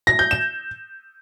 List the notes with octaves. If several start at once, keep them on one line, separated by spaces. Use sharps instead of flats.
A#6
G6
E7